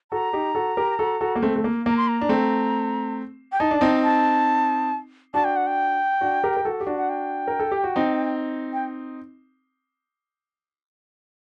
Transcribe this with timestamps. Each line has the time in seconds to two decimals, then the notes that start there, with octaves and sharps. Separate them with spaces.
0.12 F#4 A4 A#5
0.33 D#4 G4
0.55 F#4 A4
0.77 G4 A#4
0.99 F#4 A4
1.21 F#4 A4
1.35 A#3
1.42 A3 C4
1.56 A3
1.64 A#3
1.86 A#3 A#5
1.97 C6
2.08 A#5
2.21 D4
2.29 A3 C4
3.52 G5
3.60 D#4 A5
3.71 D4
3.81 C4 D#4
4.04 A5
5.34 D4 F#4 A5
5.44 G5
5.56 F#5
5.67 G5
6.21 D4 F#4
6.43 G4 A#4
6.57 A#4
6.65 F#4 A4
6.80 G4
6.87 D4 F#4
6.97 F#5
7.09 G5
7.48 A#4
7.59 A4
7.72 G4
7.84 F#4
7.96 C4 D#4
8.73 G5